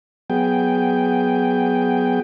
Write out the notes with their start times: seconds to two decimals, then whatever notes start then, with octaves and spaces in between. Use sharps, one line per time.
0.30 F#3 B3 G#4 G5